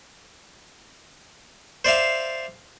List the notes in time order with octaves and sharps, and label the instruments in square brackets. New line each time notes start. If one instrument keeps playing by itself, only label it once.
[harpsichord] C5 D5 E5 F5